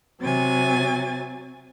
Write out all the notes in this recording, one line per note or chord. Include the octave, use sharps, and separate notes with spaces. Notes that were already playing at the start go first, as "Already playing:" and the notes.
C3 F#3 G#5 A6